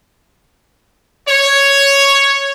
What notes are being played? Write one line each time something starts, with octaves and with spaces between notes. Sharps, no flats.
C#5